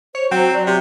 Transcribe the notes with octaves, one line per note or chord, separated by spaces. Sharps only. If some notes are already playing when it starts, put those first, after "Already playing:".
C5 C#5
F#3 C4 F#4
D5
C3 G4